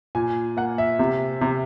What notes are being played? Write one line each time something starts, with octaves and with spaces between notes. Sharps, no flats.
A#2 G#5
A#3 F#5
E5
C3
C3